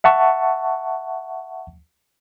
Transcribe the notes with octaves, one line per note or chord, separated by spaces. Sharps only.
E5 F#5 A5 C#6